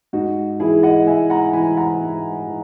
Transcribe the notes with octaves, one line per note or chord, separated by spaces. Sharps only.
G#2 D#4 F#4
E3 E4 G#4
D#5 F#5
G#2 E5 G#5
F#5 A#5
E3 G#5 B5
F#5 A#5
G#2
E3